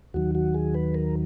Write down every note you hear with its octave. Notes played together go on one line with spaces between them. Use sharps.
D#2 D#3 F#3 F#4
F#4
G#4
B4
A#4